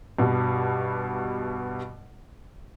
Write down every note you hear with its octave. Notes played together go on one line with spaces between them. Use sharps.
G2 B2